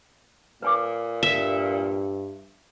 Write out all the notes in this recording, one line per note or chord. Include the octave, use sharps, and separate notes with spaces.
A#2 B4 G#5 D6
G2 E5